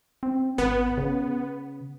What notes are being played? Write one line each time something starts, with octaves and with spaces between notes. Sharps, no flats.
C4
G#1 B3
C#3